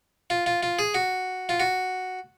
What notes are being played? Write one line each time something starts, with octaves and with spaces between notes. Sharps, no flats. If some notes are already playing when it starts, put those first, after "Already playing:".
F4
F4
F4
G#4
F#4
F4
F#4